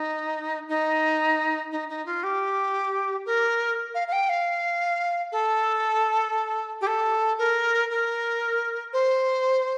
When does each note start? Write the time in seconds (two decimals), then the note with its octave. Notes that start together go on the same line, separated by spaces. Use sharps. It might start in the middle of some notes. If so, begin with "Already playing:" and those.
Already playing: D#4
0.68 D#4
1.71 D#4
1.89 D#4
2.05 F4
2.23 G4
3.26 A#4
3.94 F5
4.07 F5
4.12 G5
4.29 F5
5.32 A4
6.81 G4
6.87 A4
7.38 A#4
7.90 A#4
8.93 C5